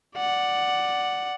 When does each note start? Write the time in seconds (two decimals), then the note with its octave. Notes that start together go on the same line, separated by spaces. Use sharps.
0.16 D5 F#5